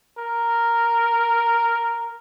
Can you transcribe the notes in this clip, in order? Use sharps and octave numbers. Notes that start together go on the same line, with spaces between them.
A#4